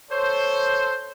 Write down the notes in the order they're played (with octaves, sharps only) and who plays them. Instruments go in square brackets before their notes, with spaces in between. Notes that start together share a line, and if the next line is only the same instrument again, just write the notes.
[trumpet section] A4 C5 [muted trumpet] C#5